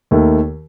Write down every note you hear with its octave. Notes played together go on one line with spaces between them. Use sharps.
D#2 D#3 A3